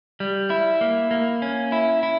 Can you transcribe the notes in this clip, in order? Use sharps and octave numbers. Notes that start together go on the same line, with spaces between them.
G3
E4
A#3
A#3
C#4
E4
E4